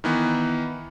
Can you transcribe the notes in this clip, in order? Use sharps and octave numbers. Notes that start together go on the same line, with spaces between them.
D#3 E3 B3